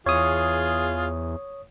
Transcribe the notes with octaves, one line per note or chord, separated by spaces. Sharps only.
E2 F4 G#4 C#5 D#6